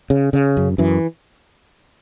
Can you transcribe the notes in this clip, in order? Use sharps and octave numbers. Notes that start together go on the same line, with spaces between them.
C#3
C#3
F#2
F#2 E3